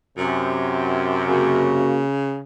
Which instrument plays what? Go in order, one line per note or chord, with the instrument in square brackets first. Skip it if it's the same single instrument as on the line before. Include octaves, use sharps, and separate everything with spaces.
[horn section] F#2 C3
[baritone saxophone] C#3 [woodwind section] A#3 F#4